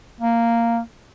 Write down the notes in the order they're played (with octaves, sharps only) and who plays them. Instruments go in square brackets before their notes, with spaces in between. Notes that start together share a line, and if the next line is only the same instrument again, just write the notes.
[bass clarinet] A#3